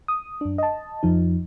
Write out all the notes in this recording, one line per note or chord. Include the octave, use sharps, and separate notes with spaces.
D#6
F#2 D4
D#5 A5
F2 F3 D#4